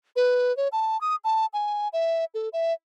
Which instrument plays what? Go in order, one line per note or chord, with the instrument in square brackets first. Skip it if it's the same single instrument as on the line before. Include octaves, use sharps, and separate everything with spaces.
[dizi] B4
C#5
A5
D#6
A5
G#5
E5
A4
E5